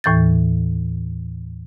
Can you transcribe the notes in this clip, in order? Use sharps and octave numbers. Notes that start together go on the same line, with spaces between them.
D#2 A2 E3 G6 A6